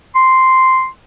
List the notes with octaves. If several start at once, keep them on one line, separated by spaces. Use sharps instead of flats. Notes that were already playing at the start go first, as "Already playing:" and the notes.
C6